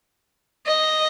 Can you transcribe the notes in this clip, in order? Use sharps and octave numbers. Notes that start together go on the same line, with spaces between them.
D#5